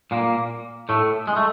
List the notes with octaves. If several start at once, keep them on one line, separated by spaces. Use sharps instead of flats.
A#2 A#3
A2 A3
G#3
A3